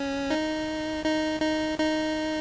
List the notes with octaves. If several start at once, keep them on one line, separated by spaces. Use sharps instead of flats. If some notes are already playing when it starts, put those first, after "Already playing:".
Already playing: C#4
D#4
D#4
D#4
D#4